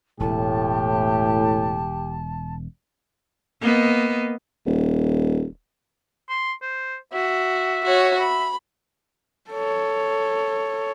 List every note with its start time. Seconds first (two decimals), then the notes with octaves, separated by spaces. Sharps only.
0.20 E1 A2 G4 A5
3.61 A#3 B3 D#5
4.66 D#1
6.29 C6
6.62 C5
7.13 F#4 E5
7.84 F#4 C#5
8.20 E5 B5
9.50 A4 C#5